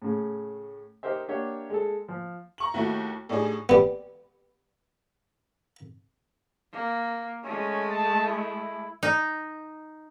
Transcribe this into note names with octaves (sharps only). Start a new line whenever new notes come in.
A2 C#3
D#4 G4 A#4 C5 E5
A#3 D4 G4 C#5 E5 F#5
G#3 A4
F3
A#5 C#6 F#7
D#2 A3 E4 F#4
A2 G3 D4 D#4 G#4
G3 B3
A#3
G#3 A3 C#4
A5
E4
D#4